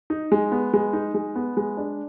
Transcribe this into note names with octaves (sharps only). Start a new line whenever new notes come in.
D#4
G#3
B3
G#3
D#4
G#3
B3
G#3
D4